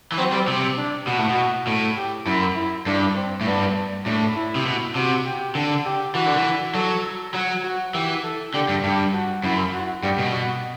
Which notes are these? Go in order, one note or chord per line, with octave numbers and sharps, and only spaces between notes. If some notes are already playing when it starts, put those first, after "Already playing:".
E3
F#3 C4
G3
C3 C4
D4
B2 F#4
A2
B2
A2
G4
F#2 E4
E4
G2 D4
C4
A2
G2 B3
A2 D4
E4
C3
B2
C3 F#4
G4
D3
G4
E3 F#4
D3
E3
F#3 A4
F#3 F#4
F#4
E3 G4
A4
D3 G4
G2
G2 G4
F#4
F#2 E4
F#4
G2 G4
B2
F#4